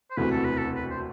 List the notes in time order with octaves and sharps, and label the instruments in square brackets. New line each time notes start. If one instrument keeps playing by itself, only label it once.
[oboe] C5
[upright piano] E1 D2 C3 E3 A3 [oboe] B4
[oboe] A4
B4
A4
B4
C5